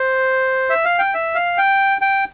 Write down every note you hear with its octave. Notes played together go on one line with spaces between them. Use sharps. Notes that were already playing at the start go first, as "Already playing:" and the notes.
Already playing: C5
E5
F5
G5
E5
F5
G5
G5